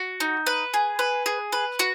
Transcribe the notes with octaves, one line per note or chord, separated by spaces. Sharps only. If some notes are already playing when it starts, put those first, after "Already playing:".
Already playing: F#4
D#4
B4
G#4
B4
G#4
B4
F#4